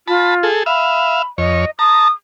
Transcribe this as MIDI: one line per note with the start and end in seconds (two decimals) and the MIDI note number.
0.08 0.46 65
0.08 0.35 81
0.08 0.35 83
0.43 0.63 68
0.43 0.63 69
0.66 1.22 76
0.66 1.22 77
0.66 1.25 83
1.38 1.65 41
1.38 1.65 73
1.38 1.70 75
1.79 2.08 81
1.79 2.08 82
1.79 2.09 87